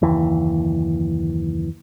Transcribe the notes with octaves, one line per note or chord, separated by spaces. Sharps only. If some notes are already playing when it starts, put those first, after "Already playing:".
F#1 D#2 E3